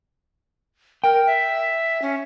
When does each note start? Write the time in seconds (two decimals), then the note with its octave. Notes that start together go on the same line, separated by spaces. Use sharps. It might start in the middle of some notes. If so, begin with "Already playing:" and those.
1.04 A#4 G5
1.26 E5
2.02 C#4